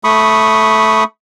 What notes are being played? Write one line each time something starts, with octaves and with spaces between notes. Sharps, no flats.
A3 B5 C#6 D#6